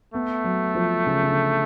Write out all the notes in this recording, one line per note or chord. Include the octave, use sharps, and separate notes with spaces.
A3 B3
F#3
F3
C#3
C#3
D3